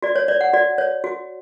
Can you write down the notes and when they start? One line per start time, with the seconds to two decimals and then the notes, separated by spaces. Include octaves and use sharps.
0.02 F#4 D5
0.16 C#5
0.28 C#5 D5
0.41 F#5
0.53 F#4 D5
0.78 C#5
1.04 F#4